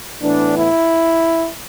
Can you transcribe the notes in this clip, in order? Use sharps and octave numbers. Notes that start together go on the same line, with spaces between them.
A2 E3 B3 D4
E4